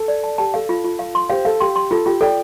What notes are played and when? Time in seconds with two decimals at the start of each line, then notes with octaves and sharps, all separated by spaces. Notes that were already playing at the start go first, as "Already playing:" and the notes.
Already playing: A4
0.08 D5
0.24 A5
0.38 G4 A5
0.54 A4 F5
0.69 F4
0.84 F4
0.99 F5
1.15 C6
1.29 G4 C5 F5
1.45 A4 F5
1.61 G4 C6
1.76 C6
1.91 F4 A4
2.06 F4 G4
2.21 A4 D5 G5